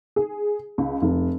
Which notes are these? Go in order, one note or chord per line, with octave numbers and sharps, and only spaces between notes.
G#4
C#2
F1